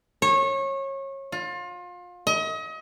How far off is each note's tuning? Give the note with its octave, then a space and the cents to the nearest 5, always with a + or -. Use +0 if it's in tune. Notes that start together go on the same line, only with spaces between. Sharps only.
C#5 -25
F4 +30
D#5 +35